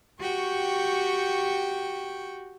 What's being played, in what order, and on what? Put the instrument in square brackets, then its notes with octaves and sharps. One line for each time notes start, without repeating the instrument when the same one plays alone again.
[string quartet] F#4 G4 G5 C#6